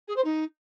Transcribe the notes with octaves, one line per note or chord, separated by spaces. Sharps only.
G#4
C5
D#4